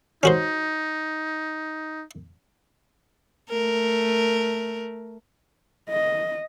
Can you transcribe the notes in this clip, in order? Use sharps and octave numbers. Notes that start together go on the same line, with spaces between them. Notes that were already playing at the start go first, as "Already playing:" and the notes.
C#4 D#4 F#4 C5
A3 A#4
D#5